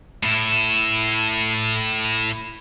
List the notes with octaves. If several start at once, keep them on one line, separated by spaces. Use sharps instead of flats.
A2 E4